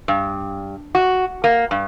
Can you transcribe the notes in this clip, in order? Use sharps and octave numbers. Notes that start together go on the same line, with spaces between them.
G2
F#4
A#3
G2